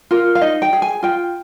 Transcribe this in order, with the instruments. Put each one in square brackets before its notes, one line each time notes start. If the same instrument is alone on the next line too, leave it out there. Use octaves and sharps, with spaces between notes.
[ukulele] F4 A#4
F5
D#4 D#5
G5
G#4
G#5
F4 G5